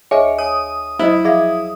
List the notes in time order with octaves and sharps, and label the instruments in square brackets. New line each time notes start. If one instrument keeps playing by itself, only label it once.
[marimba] D2 D#5 [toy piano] G#4 E5 G#5 [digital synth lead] C#5
[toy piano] C#5 G#5 [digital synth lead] D#6
[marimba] F#3 [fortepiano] E4 [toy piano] C5 D#5
[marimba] F3 F5 G#6 [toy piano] G#4 E5